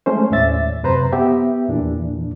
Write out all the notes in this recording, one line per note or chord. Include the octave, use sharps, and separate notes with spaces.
G#3 A3 C#4 C5
D#2 A2 C#4 D5 E5 A6
F#2 C3 B4 C5 A#5
B3 G4 E5
E2 A#2 E3 D4